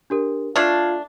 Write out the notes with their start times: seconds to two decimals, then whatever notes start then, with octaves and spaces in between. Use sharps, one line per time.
0.10 D4 G4 A#4
0.56 A3 D4 F4 F6 G#6 C7